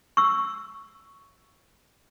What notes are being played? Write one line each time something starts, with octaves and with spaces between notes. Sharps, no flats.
C#6 E6